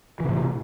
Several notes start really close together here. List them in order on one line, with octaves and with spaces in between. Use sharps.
E3 C3 A2